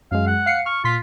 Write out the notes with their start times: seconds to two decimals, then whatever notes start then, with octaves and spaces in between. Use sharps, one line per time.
0.12 F#2 G#3 F5
0.27 F#5
0.46 F5 C7 C#7
0.66 C#6 F6
0.84 A#2 F4 C6 B6